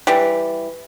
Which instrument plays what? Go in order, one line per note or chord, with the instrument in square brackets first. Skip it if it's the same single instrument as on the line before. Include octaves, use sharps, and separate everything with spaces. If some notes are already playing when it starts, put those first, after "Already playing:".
[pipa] E3 G3